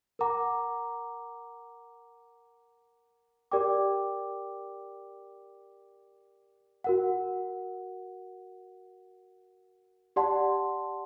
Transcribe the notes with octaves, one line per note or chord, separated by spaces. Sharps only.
A#4 F#5 A#5 D6
G4 A#4 D5 G5 D6
F#4 A#4 F#5
G4 D5 F#5 A5 C6